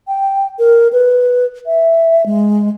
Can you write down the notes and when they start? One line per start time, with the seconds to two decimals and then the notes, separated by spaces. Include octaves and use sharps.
0.08 G5
0.59 A#4
0.92 B4
1.66 E5
2.26 G#3